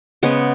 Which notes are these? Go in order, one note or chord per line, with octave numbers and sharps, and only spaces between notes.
C#3 G#3 B3 F#5